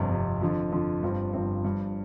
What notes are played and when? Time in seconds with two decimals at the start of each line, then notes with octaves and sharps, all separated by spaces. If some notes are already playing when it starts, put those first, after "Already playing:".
Already playing: G1 F2 C3
0.11 G1 F2 C3
0.41 F2 D3 F3
0.72 F2 D3 F3
1.03 G1 G2 F3 C4
1.33 G1 G2 F3 C4
1.64 G2 F3 D4